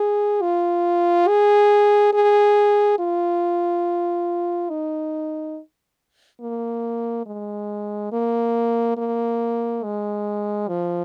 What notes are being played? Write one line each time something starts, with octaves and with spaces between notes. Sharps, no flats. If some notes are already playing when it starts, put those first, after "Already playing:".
Already playing: G#4
F4
G#4
G#4
F4
D#4
A#3
G#3
A#3
A#3
G#3
F3